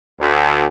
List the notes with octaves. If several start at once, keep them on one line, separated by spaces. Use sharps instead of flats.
D2